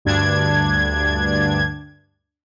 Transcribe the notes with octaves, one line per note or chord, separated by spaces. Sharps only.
D2 G2 D4 G#6